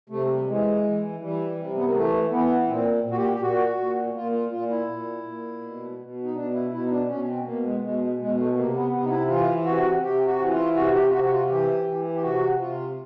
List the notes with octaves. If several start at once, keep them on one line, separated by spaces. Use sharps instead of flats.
C3 A3
G3
E3 G#3
E3
E3 G3
C3
B3
A#3
E3 A3
E3 B3
A#2 C4
A#2
F#4
G4
G4
A#2 F#4
A#2
A#2 F4
F4
A#2 F4
E4
A#2
A#2
B2
B2
D#4
B2 D4
E4
B2 E4
D#4
D4
B2 C#4
C4
B2 A#3
G#3
B2 G#3
B2 G#3
A3
C3 A#3
B3
C3 B3
D#4
E4
E3 F4
C3 F#4
C3 G4
F#4
E3
F4
C3 F#4
G4
F4
C3 F#4
F#4
F4
E3 G4
E3
G4
C3 F#4
C3 F4